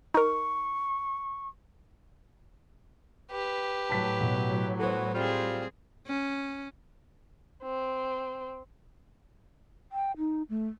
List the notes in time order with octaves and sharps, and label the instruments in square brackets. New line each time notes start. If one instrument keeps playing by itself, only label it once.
[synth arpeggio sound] D#4 A#4 [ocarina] C#6
[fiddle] G4 B4
[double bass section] A2 F#3 [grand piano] A5 B6
[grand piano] B2
[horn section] E3 B3 F#4 [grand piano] A4 C5
[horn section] G3 F4 [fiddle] C4 G#4
[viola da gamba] C#4
[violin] C4
[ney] G5
D#4
A3